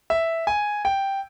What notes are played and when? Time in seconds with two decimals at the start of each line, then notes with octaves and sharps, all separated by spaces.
0.10 E5
0.47 G#5
0.85 G5